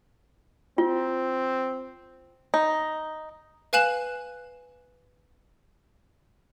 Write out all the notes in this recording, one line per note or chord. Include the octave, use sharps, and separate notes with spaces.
C4 F4
D#4
B4 F5 G#5 F#6 E7 F#7